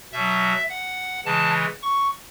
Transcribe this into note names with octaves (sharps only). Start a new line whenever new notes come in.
B2 E5
F#3
F#5
C#3 E3 G#3 A5
C#6